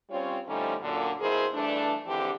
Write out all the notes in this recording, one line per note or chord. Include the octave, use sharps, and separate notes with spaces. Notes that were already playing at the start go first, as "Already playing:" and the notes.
G3 C4 C#4 F4 C#5
D3 F3 G3 A3 C#4 D#4
F#2 A#2 D3
F2 B2 E4 G#4 A#4 C5
G2 E3 A3 D4
F2 G#2 D3 E3 C4 G4